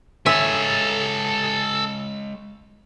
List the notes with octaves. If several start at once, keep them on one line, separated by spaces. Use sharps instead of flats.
G#3 A4 C#5 E5 G#5